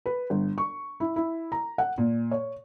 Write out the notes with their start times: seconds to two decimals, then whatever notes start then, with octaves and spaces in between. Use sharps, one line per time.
0.06 B4
0.30 G1
0.58 C#6
1.00 E4
1.16 E4
1.52 A#5
1.78 F#5
1.98 A#2
2.31 C#5